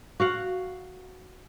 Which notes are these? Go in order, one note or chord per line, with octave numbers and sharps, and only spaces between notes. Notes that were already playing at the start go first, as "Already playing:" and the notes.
F#4 F5 F#5